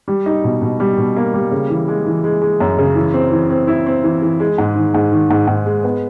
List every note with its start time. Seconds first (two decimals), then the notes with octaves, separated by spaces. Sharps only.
0.08 G3
0.26 D#4
0.44 B2
0.62 B2
0.80 G3
0.98 B2
1.16 A#3
1.34 G3
1.51 C#3
1.70 E3
1.88 G#3
2.06 E3
2.24 G#3
2.42 G#3
2.60 F#2
2.78 C#3
2.95 E3
3.14 C4
3.32 E3
3.50 C4
3.67 E4
3.86 C4
4.04 E3
4.22 E3
4.40 G#3
4.58 G#2
4.75 D#3
4.94 G#2
5.12 D#3
5.30 G#2
5.47 G#2
5.66 G#3
5.84 B3